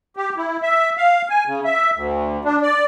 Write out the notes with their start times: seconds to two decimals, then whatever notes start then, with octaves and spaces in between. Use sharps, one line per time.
0.17 G4
0.37 E4
0.62 E5
0.97 F5
1.30 G#5
1.46 C#3
1.65 E5
1.95 D2
2.45 D4
2.62 D5